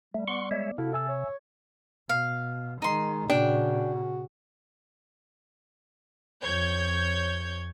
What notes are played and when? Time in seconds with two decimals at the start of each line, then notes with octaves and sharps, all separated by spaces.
0.14 G3 A3
0.28 B3 D5 F#5 C6 C#6
0.51 G#3 C#5 E5
0.78 C3 E4 F#4 A4 F5
0.93 A4 E5 G#5 E6
1.09 C#5
2.09 B2 F5
2.82 D#3 G#3 D#4 C6
3.30 A#2 C#3 D4 F#4 G5
6.41 F2 C#5 G6 G#6